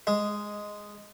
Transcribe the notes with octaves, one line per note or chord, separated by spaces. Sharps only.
G#3